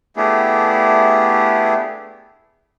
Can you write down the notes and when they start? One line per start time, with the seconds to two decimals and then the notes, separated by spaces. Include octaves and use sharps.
0.17 A3 B3 D4 E4 G4 G#4